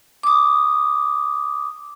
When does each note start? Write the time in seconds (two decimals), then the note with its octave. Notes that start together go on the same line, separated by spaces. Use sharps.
0.23 D6 D#6